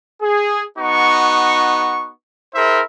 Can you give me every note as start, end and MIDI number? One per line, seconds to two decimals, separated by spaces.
0.21 0.62 68
0.78 2.09 59
0.78 2.09 63
0.78 2.09 66
0.78 2.09 85
2.54 2.81 64
2.54 2.81 68
2.54 2.81 70
2.54 2.81 72
2.54 2.81 76